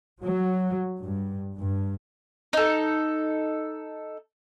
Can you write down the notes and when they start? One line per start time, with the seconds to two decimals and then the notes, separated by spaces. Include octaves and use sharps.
0.22 F#3
1.01 G2
1.55 G2
2.53 D#4 A4